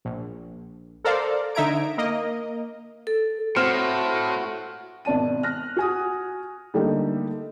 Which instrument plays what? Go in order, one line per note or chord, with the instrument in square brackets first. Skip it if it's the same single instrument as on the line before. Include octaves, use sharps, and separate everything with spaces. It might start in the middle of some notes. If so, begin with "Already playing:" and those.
[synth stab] A#1
A4 A#4 C5 D5 F5
D3 D#4 E5 A#5 G#6 D7
A#3 A#4 D#5
[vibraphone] A4
[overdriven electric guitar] A2 [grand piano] C4 F6 E7 [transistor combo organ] F#4
[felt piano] G#1 B2 D5 A5 D#7
F6 F#6 A#6
F#4 G#5 D#6
D3 G3 A3 A#3 D#4 G4